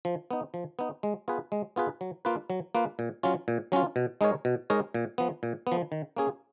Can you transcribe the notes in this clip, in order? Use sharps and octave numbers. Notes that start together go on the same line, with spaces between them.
F3
B3 D#4
F3
B3 D#4
G#3
B3 F4 G#4 B4
G#3
B3 F4 G#4 B4
F#3
A#3 F4 B4
F#3
A#3 F4 B4
A#2
F#3 C#4 F4
A#2
F#3 C#4 F4
B2
G#3 D#4 A#4 C#5
B2
G#3 D#4 A#4 C#5
A#2
F3 B3
A#2
B3
F3
D#3
A#3 C#4 G#4